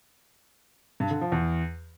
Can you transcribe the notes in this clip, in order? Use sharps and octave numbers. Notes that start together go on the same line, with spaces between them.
G2
D3
F3
E2